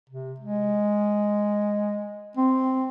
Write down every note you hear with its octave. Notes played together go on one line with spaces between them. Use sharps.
C3
G#3
C4